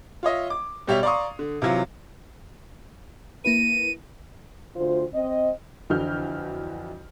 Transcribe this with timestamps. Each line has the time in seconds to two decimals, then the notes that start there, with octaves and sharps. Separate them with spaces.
0.23 F4 C#5 D#5 E5
0.50 D6
0.87 B2 G3 G4 C#5 E5 F7
1.03 D5 F5 A#5 C6 C#6 D#6
1.39 D3
1.62 C3 E3 F#3 F4
3.45 A#3 E4 B4 D#7
4.76 D2 F4 C5
5.14 C4 D#5
5.90 F2 D3 E3 F#4 F6 G6